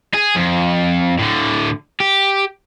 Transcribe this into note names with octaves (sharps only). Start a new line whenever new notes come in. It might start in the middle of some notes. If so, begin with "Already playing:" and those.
G#4
F2
A2 D3
G4